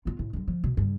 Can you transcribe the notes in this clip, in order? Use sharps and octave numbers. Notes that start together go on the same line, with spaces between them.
B3 F4
A2
D3 F#3
F3
B2
G2 C#3